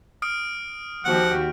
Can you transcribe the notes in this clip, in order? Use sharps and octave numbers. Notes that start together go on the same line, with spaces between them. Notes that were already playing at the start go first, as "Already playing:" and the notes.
D#6 F6 D7
D#2 F3 F#4 G4 F#5